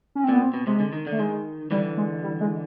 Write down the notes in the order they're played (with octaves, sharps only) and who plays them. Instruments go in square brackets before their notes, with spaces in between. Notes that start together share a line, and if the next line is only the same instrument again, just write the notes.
[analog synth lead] C#4
C4
[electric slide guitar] A#2 [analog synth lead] B3
[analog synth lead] C4
[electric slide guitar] B2
[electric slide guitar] C3 [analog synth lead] G#3
[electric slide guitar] D3
D#3
D3
[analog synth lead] A3
[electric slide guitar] D#3 [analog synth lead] G#3
[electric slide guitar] D3 E3 [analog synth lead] G3
[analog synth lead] G#3
G3
G#3